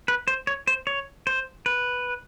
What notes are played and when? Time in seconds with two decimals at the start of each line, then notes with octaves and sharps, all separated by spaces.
0.08 B4
0.28 C5
0.47 C#5
0.67 C5
0.87 C#5
1.27 C5
1.66 B4